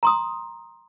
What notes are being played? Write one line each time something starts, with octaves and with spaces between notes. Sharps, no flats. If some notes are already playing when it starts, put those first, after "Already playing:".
A#5 C6 D#6